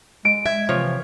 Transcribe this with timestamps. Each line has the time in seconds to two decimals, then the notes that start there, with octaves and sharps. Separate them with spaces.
0.25 G#3 D7
0.46 E5 G#6
0.69 C3 E3 F3 C#5